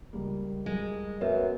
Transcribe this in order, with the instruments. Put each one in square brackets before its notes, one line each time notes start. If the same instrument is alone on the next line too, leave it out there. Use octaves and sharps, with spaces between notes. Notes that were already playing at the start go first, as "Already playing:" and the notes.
[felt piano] C#2 G3 A#3
[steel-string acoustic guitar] G#3
[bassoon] F#2 [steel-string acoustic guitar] B3 [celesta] B4 E5